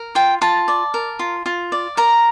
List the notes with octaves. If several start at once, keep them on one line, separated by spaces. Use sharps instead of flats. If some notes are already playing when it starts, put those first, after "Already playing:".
Already playing: A#4
F4 G5
F4 A5
D5
A#4
F4
F4
D5
A#4 A#5